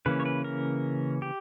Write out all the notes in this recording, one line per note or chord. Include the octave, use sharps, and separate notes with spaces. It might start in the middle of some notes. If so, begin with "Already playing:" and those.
C#3 E3 A#3 C#4 B4
C#5
B4
A#4
G4